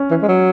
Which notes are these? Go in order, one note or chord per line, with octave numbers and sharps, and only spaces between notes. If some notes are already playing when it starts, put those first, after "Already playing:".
Already playing: C#4
E3
G#3
F#3